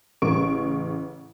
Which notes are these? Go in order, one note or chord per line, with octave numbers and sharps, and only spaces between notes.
A1 C#3 C#6 D7